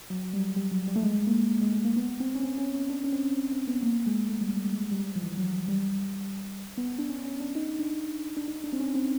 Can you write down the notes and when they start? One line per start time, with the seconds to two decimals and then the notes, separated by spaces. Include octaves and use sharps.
0.10 F#3
0.33 G3
0.56 G3
0.71 F#3
0.88 G3
0.96 A3
1.03 G#3
1.27 A#3
1.61 G#3
1.73 A3
1.85 A#3
1.96 B3
2.20 C4
2.35 C#4
2.43 C4
2.58 C#4
2.74 C#4
2.89 D4
3.04 C#4
3.12 C4
3.36 C4
3.52 C4
3.67 B3
3.83 A#3
4.06 G#3
4.29 A3
4.41 G3
4.53 G3
4.65 G3
4.76 G#3
4.91 G3
5.16 F3
5.22 E3
5.37 F#3
5.68 G3
6.77 B3
6.98 D4
7.09 C#4
7.24 C#4
7.40 D4
7.55 D#4
7.79 D4
8.37 D4
8.48 D#4
8.64 D4
8.73 C4
8.80 C#4
8.95 C4